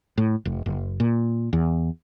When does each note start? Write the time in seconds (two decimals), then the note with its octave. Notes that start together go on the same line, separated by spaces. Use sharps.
0.18 A2
0.45 F1
0.66 F#1
1.00 A#2
1.53 E2